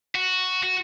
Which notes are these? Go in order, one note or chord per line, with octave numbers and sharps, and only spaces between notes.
F#4
F#4